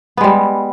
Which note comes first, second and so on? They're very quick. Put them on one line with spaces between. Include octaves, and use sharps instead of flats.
B3 G#3 G3